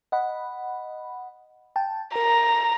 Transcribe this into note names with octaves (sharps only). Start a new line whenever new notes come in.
D#5 F#5 B5
G5 A5
A#4 A#5